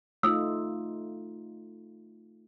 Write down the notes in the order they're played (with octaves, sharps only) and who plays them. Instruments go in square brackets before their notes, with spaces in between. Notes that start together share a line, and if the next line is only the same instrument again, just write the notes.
[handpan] A3 D#4 F4 [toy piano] D#6 E6